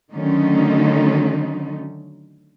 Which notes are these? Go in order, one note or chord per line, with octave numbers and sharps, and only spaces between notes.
D3 D#3 F#3 A3 C#4 D#4